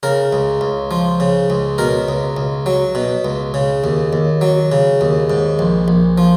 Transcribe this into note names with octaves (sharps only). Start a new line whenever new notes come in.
C#3 A#4
C#2
C#2
F3
C#3
C#2
B2 A#4
C#2
C#2
F#3
B2
C#2
C#3
D#2
D#2
F#3
C#3
D#2
G#2
A#1
A#1
F3